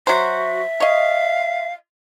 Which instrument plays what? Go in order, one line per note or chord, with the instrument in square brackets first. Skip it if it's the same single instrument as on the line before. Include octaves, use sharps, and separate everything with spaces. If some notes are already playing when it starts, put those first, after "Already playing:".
[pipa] F#3 C5 [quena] F#4 [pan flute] E5
[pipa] C#5 D#5 [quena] F5